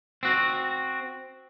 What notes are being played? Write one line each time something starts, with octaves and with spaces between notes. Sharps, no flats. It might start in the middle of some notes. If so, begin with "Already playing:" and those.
C4 F#4